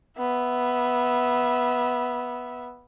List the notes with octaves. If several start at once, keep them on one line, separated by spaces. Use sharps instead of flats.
B3 E5